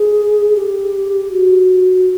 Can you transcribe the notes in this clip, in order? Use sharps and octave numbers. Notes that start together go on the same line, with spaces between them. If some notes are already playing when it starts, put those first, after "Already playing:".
Already playing: G#4
G4
F#4